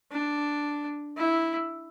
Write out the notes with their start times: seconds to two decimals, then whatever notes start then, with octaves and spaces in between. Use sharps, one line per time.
0.11 D4
1.17 E4